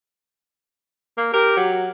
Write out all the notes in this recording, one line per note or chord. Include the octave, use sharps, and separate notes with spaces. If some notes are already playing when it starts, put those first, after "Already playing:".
A#3
G4 A#4
F#3